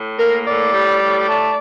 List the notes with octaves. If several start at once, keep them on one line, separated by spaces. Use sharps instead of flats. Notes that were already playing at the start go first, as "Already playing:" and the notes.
Already playing: A2
A#3 A#4
A2 D5
G3
A2
A3